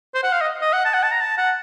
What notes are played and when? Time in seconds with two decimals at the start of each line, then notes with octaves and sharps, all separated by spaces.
0.15 C5
0.23 F#5
0.32 F5
0.41 D#5
0.62 D#5
0.73 F#5
0.85 A5
0.94 F#5
1.03 A5
1.11 A#5
1.20 A5
1.38 F#5